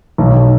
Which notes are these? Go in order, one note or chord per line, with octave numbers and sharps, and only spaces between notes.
B1